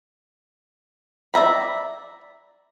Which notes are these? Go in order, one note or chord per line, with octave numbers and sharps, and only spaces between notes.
D5 E5 A#5 B5